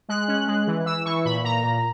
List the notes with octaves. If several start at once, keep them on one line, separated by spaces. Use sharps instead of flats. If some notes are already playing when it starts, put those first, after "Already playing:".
G#3 F#6
C#4
G#3
E3
E3 E6
E3 C#6
A#2 B5
A#2 A#5
A#2